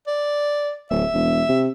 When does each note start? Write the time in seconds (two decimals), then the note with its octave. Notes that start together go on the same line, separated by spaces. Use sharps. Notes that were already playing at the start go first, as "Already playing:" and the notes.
0.07 D5
0.91 D1 E5
1.14 E1
1.49 C3